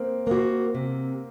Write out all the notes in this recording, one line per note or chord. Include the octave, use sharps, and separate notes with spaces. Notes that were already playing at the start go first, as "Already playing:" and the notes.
Already playing: A#3 C4
A#3 F#4
C3